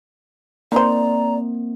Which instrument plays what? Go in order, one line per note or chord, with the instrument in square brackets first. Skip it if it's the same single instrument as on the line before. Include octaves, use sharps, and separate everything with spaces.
[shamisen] D#3 C5 [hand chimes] A#3 C4 [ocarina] D5 [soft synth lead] A#5